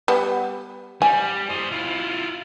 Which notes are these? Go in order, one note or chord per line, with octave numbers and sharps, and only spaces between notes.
G3 B3
G3 G#5
C5 D#5
E4 F4